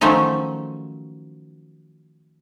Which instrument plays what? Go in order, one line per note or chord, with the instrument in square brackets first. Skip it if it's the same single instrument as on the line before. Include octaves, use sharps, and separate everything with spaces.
[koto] D#3 F3 F#3 A3 C#4 D#4